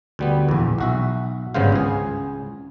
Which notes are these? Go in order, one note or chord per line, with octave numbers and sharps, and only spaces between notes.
D2 G3 B3
A#1 E2
B1 F#4 E5
G#1 G2 C#3 B3 C5 F5
C#2 G#4